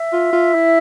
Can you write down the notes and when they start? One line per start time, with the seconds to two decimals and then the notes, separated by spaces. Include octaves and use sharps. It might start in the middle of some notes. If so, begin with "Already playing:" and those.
Already playing: E5
0.13 F4
0.33 F4
0.54 E4